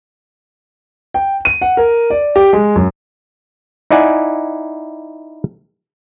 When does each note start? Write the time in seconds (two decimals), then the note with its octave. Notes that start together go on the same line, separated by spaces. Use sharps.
1.14 G5
1.45 D#7
1.62 F#5
1.77 A#4
2.10 D5
2.36 G4
2.53 G#3
2.76 F#2
3.91 D#4 E4 D5 F#5 G#5